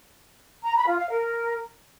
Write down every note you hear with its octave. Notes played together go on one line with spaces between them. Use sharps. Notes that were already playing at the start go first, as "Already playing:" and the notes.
A#5
B5
F4
F5
A#4